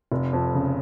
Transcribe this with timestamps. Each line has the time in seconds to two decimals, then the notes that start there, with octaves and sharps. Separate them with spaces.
0.12 F1
0.33 F2
0.54 C#3